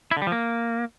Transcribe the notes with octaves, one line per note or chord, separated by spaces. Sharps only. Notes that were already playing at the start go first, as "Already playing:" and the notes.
E4
D3
G3
F3
A#3